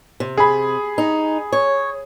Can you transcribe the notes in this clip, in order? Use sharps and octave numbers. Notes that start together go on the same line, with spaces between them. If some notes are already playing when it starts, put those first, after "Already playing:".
C3
G#4 B5
D#4
C#5